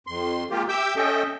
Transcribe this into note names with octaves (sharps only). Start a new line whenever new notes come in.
F2 C6
G#3 A#3 F4 G4
G4 E5 D6 E6 G6
C#4 A4 D#5 E5 G5